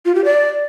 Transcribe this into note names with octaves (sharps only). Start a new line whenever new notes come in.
F4
G4
D5